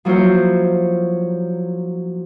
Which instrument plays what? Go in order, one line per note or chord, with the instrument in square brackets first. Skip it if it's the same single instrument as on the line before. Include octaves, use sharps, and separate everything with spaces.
[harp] F3 F#3 A#3 E4 C5